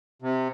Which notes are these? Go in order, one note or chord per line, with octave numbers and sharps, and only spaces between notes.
C3